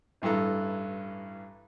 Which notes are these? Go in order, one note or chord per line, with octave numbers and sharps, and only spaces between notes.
A1 G2 E3 A4 A#5